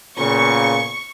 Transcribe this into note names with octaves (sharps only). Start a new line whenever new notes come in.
A#2 C#3 B3 C#6